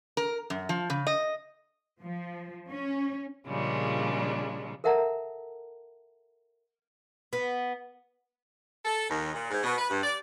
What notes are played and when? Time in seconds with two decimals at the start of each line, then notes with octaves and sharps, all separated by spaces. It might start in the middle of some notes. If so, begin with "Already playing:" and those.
0.17 A#4
0.50 F#2
0.69 F3
0.90 C#3
1.07 D#5
2.02 F3
2.70 C#4
3.47 A#2 C#3 F3 G3 G#3 D4
4.84 A4 A#4 E5 F#5 A5 A#5
7.33 B3
8.85 A4
9.08 D#2
9.34 A#2
9.50 G#2
9.63 B2
9.78 B4
9.90 G2
10.03 D5